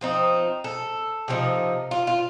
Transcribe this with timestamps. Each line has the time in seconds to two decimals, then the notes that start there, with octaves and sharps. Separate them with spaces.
0.01 F3 C4 D#4
0.64 A4
1.28 C3 F3 C4 D#4
1.91 F4
2.07 F4